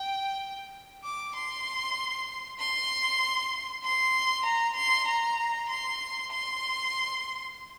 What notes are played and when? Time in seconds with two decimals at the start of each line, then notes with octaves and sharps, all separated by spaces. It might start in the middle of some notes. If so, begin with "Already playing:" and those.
Already playing: G5
1.04 D6
1.35 C6
2.59 C6
3.84 C6
4.45 A#5
4.76 C6
5.07 A#5
5.69 C6
6.31 C6